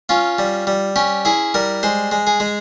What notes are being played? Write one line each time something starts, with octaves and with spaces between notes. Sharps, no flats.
C#4 F4
G3
G3
C#4 G4
E4 G#4
G3 A#4
G#3 C5
G#3
G#4
G#3